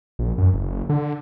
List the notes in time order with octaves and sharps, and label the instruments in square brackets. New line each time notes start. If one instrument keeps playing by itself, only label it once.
[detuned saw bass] A#1
F#2
F#1
D3